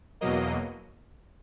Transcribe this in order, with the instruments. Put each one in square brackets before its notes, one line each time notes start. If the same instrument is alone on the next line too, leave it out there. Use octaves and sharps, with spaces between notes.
[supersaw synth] E2 B2 F#3 A#3 D#5